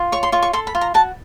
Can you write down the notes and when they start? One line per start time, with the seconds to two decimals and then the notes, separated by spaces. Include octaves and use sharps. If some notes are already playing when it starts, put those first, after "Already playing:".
Already playing: F4
0.12 C#5 C#6
0.23 C6
0.32 F4 C#6
0.43 C#6
0.53 A4 C6
0.67 B5
0.75 F4
0.81 A#5
0.94 F#4 A5